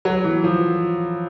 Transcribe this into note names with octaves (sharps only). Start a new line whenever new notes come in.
F#3
E3
F3